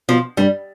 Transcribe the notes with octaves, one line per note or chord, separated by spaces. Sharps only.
B2 F3
G2 G3